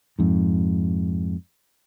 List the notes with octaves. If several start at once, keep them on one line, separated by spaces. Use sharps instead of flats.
F2 G#2